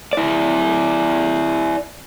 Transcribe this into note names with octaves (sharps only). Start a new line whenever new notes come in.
E4 D5